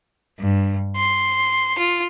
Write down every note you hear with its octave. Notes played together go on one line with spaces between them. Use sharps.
G2
C6
F4